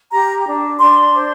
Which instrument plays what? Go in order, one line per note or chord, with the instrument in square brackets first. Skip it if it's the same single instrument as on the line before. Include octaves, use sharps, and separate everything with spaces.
[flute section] G4 A#5
D4
D4 C6
C5